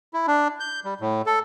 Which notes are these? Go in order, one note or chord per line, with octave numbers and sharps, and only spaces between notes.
E4
D4
G6
G3
A2
A4